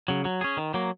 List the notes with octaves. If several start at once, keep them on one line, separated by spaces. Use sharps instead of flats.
C#3 F#3
F#3
C#4 G#4
D#3
F#3 A#3